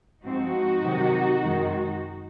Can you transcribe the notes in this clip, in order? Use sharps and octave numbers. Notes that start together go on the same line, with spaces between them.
G#2 F3 C4 D#4 F#4
C3 D#3 F#3
F#2 D#3 G#3